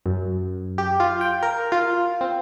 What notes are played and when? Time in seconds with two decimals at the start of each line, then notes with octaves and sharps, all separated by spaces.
0.06 F#2
0.78 G4
1.00 F4
1.21 G5
1.43 A#4
1.72 F4
2.21 C4